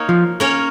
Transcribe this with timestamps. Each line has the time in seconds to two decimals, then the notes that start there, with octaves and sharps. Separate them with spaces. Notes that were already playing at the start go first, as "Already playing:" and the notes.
Already playing: A#3 D#4 C#5
0.09 F3
0.40 A#3 C#4 A#4 C#5